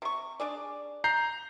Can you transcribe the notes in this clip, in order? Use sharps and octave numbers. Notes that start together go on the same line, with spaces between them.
C3 C#6
D4 G#4 D5
A#5 G6 C7